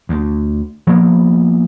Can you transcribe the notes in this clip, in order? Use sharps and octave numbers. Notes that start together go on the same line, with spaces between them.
D2
F3 A#3 B3